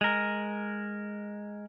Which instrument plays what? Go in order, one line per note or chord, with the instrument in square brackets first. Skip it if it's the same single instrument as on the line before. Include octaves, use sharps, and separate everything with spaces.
[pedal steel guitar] G#3 A#4